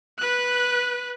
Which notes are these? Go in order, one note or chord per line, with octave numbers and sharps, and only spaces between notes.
B4 F#6